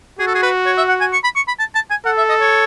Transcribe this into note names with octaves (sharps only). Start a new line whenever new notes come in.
F#4 G#4
A4
G#4
B4
C#5
E5
F#5
G#5
C#6
B5
C#6
B5
A5
A5
G#5
A4 F#5
E5
D#5
C#5